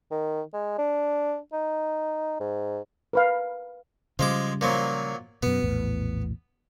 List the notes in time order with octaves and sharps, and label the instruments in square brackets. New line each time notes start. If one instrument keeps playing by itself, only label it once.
[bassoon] D#3
G#3
D4
D#4
G#2
[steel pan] A#4 B4 F5
[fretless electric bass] C#3 G3 [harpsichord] F3 G#3 D6
[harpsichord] A#2 F3 F#3
[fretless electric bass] F#2 B2 [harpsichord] B3
[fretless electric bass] A#1 E2 A2